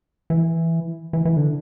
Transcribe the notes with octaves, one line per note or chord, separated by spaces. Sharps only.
E3
E3
E3
D3